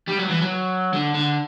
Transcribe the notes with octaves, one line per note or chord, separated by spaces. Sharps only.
G3
F#3
E3
F#3
D3
D3